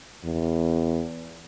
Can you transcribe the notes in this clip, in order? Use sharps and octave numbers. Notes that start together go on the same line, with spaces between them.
E2